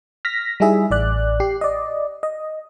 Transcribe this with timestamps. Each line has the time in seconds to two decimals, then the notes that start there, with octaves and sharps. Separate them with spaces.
0.25 F6 A#6 B6
0.60 G3 D#4 E4 G#4 E5
0.91 A1 D5 F#6
1.40 G4 C7
1.61 D5 D#5
2.23 D#5